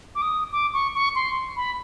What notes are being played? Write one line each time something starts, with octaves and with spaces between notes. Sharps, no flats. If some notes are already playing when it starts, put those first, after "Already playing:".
D6
D#6
D6
C#6
C#6
C6
B5